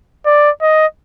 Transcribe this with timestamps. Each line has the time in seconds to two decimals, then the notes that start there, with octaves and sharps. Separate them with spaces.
0.26 D5
0.62 D#5